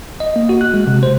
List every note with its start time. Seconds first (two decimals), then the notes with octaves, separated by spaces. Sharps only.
0.20 D#5
0.36 A#3
0.49 F#4
0.61 F#6
0.74 G#3
0.87 C3
1.03 C5